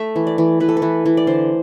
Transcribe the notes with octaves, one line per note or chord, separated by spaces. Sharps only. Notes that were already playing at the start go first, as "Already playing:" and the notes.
Already playing: A3 E5
E3
D5
E3
E3 B4
A4
B4
E3
E3
D5
D3 C5